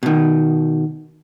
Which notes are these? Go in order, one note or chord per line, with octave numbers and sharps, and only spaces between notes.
B2 D#3